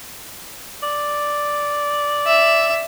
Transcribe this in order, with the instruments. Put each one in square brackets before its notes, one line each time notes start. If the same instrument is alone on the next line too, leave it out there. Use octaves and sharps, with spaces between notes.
[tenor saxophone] D5
[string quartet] E5